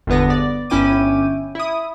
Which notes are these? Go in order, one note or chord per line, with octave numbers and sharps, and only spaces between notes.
G1 E2 D3 B3 A#6
D5
G1 C#4 E4 G5 D6 D#7
E4 D#6